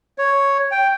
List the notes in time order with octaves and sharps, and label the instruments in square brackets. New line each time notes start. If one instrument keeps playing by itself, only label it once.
[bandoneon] C#5
G5